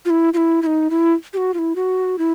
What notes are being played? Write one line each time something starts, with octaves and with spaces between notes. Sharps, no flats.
F4
E4
F4
E4
E4
D#4
E4
G4
F#4
F4
E4
F#4
E4